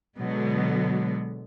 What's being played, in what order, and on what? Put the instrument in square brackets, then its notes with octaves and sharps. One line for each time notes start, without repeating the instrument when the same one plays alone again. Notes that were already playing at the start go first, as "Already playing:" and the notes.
[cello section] B2 D3 F#3 G#3 B3